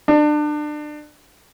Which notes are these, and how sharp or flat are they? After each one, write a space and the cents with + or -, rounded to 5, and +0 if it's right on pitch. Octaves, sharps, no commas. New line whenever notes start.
D4 +30